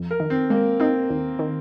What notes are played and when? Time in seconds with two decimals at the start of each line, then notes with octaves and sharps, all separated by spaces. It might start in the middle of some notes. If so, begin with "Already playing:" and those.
Already playing: F2
0.11 A#4
0.20 D#3
0.30 C4
0.50 G#3 A#3
0.80 C4 D#4
1.10 D#2
1.39 D#3